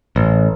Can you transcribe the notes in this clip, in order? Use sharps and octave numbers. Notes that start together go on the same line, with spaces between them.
A1